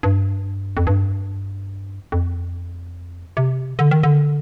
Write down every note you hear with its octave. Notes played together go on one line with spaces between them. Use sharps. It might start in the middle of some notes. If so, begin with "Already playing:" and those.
G2
F2
G2
F2
C3
D3
D#3
D3